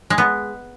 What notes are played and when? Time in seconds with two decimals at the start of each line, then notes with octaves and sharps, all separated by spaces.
0.10 G#3
0.18 B3